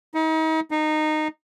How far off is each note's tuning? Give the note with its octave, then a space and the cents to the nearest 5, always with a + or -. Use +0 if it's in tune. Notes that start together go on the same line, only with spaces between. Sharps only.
D#4 +40
D#4 -15